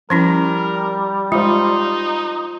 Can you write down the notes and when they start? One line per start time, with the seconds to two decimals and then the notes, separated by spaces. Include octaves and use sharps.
0.10 F3 G3 C#4 E4 A#4
1.32 G#3 D#4 F4 C5